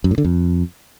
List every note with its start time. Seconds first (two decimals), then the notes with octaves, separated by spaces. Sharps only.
0.04 F#2
0.11 A2
0.18 D3
0.25 F2